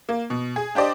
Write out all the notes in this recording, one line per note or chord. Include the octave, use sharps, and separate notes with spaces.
A#3
B2
G#4
D4 G4 C5 D5 D#5